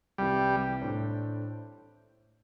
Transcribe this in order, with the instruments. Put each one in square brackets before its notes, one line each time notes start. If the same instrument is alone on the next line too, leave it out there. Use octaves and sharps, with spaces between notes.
[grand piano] C2 C3 E3 [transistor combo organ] G3
[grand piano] A2 A3 D4 C5